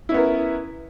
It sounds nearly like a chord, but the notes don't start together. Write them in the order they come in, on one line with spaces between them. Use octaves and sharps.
E4 C#4 B3 A#4